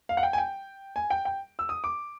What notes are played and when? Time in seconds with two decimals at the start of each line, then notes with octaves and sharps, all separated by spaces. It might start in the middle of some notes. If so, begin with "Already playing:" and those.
0.09 F5
0.17 F#5
0.23 G5
0.33 G#5
0.38 G5
0.96 G#5
1.10 G5
1.25 G5
1.59 E6
1.69 D#6
1.84 D6